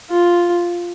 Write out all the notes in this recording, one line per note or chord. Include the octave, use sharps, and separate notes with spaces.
F4